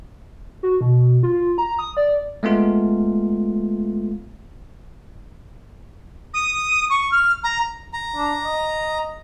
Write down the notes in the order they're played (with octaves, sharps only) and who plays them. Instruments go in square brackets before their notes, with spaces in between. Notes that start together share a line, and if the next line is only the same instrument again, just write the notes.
[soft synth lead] F#4
B2
F4
A#5
D#6
D5
[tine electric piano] G#3 A3 B3 F4
[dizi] D#6
C#6
F6
A#5
[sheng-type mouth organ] A#5
[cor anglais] D4
D#5